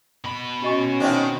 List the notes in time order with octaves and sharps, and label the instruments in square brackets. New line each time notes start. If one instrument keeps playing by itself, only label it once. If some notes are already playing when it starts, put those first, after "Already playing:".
[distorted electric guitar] B2 B5
[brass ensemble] C#4 [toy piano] F#4 D#5 C#6
[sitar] D#3 C4 D4 [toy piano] C5 D5 E5